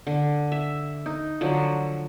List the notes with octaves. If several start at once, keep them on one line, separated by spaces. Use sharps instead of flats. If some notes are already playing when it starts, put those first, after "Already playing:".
D3
E5
D#4
D3 F3 F#3